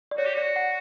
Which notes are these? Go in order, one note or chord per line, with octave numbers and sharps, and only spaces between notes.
D5
F#4 C#5
G4
F#4 D5
F#5